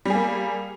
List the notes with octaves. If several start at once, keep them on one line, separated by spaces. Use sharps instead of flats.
G3 A#3 G#4